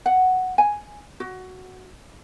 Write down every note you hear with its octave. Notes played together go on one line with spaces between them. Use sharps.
F#5
G#5
F#4